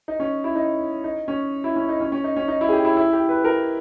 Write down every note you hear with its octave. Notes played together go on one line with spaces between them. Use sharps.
D#4
C#4
E4
D#4
D#4
C#4
E4
C#4
D#4
C#4
C#4
D#4
C#4
D#4
E4
G#4
G4
E4
E4
G4
B4
A#4